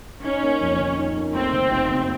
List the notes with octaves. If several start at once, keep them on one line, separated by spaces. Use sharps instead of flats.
C#4 D#4
A#3
F2
D#3
D#4
A#3
A3 C4
D#3
F#1
F#2